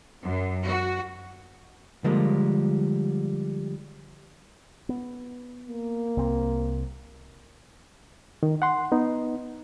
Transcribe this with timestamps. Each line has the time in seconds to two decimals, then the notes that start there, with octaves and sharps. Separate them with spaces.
0.25 F#2
0.66 F#4
2.04 D3 F3 G3 G#3 A#3
4.89 B3
5.68 A#3
6.17 C2 C4
8.43 D#3
8.62 F#5 C6
8.92 B3 D#4